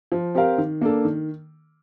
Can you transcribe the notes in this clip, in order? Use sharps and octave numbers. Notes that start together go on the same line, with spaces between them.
F3
C4 G4 A#4 F5
D#3
A#3 D4 A4
D#3